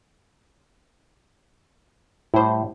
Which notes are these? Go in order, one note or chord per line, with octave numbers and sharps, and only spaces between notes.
A2 G3 E4 C5